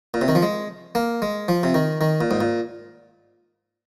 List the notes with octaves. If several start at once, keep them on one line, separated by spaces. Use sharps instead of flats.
A#2
C3
D#3
F3
G#3
A#3
G#3
F3
C3
D#3
D#3
A#2
G#2
A#2